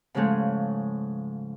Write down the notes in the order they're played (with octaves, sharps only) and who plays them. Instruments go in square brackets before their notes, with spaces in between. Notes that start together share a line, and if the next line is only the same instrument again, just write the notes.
[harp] G#2 C#3 F3 G#3 A3